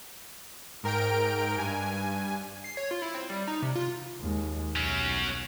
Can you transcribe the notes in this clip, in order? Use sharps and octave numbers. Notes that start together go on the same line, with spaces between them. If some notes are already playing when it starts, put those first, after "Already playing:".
G#2 A#4 G5 D7
G2 G#5
C7
C#5
F4
E4
C4
G3
D#4
C3
F4
D#2 G#3
B1 F#3 C#4